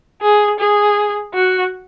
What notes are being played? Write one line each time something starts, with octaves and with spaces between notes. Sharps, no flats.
G#4
G#4
F#4